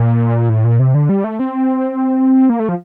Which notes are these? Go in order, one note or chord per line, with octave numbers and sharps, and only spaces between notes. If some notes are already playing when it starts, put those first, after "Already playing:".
Already playing: A#2
A2
A#2
C3
D3
G3
A3
C4
A#3
A3
F3